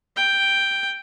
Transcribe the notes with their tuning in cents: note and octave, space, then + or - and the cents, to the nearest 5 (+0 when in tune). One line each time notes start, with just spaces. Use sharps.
G5 +0